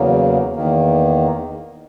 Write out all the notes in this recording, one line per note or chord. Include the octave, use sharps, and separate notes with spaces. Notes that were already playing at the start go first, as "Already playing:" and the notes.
Already playing: E2 C#3 F#3 A#3
E2 D#3 A#3